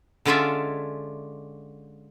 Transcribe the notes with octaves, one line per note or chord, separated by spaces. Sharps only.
D3 G#3 C#4 F4 D5 E5